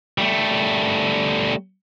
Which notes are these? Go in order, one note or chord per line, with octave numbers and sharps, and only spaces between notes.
G3 A3